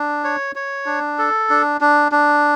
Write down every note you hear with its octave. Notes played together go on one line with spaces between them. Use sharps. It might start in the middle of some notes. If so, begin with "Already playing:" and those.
Already playing: D4
C#5
C#5
D4
A4
D4
D4
D4